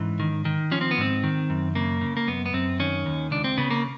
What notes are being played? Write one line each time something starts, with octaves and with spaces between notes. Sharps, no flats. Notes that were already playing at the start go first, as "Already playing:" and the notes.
Already playing: G#2 E3 C#4
D#3
D#3
F3 C#4
C4
B3
G#2 C4
D#3
F#2
C#3 A#3
C#3
A#3
F#2 B3
B3
F#2 C4
D#3 C#4
D#2
C#2 D4
C4
C#3 B3
A#3